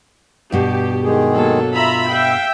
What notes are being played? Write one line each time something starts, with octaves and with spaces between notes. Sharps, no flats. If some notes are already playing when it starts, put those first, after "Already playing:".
G2 B2 G4
D#3 G#3 G#4
F#3 A#3 A4
F4 E5 A#5 B5
E5 F5 G5